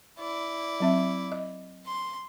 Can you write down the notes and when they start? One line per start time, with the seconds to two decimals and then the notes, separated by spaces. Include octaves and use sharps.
0.19 E4 D5
0.80 F#3 C4 E5
1.32 D#5
1.86 C6